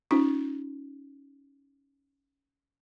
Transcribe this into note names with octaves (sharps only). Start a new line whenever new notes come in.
C#4 D#4 F4